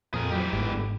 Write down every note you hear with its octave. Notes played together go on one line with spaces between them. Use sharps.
F2 A#2 G#4 A#4
E3 F#3 G4
G1 G#2
G#2